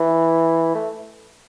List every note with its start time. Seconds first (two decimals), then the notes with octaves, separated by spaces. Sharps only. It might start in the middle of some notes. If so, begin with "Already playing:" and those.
Already playing: E3
0.75 A3